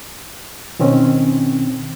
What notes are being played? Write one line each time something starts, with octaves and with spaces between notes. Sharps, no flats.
B2 D#3 C4 C#4